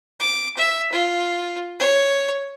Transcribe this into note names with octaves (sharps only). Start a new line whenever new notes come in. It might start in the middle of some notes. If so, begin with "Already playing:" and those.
D6
E5
F4
C#5